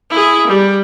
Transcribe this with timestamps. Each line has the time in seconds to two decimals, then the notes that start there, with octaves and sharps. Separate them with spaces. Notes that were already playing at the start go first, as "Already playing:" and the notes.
0.10 E4 G#4
0.47 G3